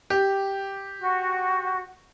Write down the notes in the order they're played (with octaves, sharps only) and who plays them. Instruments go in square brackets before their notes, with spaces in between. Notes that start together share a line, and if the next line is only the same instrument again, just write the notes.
[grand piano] G4
[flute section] F#4